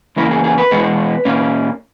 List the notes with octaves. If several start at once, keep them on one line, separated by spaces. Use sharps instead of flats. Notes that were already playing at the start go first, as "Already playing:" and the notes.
E2 C#3 A#3 E4
G#4
G#4
B4
E2 B2 G#3 B3
A#2 A#3 C#4